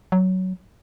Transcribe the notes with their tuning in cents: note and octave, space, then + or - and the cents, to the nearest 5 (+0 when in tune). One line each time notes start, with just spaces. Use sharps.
F#3 +10